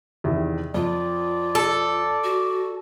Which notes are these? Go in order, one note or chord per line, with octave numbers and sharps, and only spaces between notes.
E2 C3 D#3
F2 F4 D5
A4
F#4